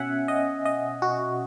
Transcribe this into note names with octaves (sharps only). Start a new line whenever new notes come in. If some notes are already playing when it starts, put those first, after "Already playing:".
Already playing: B2 C#4 E5 F#5 G#5
D#5
D#5
F#4